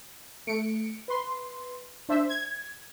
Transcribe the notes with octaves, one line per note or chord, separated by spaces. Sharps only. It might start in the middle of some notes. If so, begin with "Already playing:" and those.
A3 C#7 D7
B4 C6
D4 C5 E5
G#6